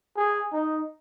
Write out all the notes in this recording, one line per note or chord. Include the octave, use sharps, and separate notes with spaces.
G#4
D#4